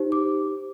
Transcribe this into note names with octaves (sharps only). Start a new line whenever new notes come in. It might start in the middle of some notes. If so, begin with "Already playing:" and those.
Already playing: D#4 G4 C5
D6